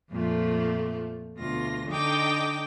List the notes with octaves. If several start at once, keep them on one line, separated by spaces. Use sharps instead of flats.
F2 A#2 F3 A3
D2 B2 F4 A#6
D3 D#4 D#5 G5 D6